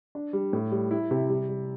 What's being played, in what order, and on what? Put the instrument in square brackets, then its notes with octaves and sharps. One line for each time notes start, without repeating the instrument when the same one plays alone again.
[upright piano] D4
G3
A2
G3
E4
C3
G3
G3